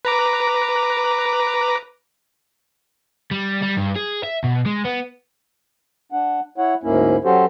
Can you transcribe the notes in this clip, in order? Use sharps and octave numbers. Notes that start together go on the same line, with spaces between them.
B4 A#5 D6
G3
G3
G2
G#4
E5
B2
G#3
B3
D4 F#5
E4 C#5 F#5
D2 G#2 A#3 C#4 E4
F#3 C#4 F#4 G4 A4 C5